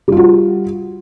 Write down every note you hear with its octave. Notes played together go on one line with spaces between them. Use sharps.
G3 F4 F#4